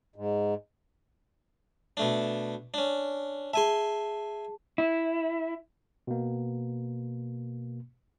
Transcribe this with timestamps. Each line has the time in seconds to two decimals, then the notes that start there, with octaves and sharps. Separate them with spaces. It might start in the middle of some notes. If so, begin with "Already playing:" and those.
0.16 G#2
1.97 B2 A3 D4
2.74 C#4 D4
3.53 G#4 E5 G#5 A5 C6
4.78 E4
6.07 B2 A#3